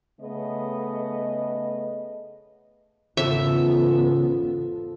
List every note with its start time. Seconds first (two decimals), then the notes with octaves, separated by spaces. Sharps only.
0.21 C#3 A3 B3 D#5
3.17 G#1 E2 C#3 F3 B3 A4 A#4 E5